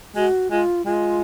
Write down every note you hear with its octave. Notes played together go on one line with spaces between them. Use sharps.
G#3 F#4
G#3 F4
G#3 F4